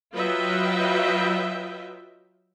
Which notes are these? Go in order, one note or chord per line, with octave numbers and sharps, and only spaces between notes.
F#3 F4 B4 D#5 E5 G5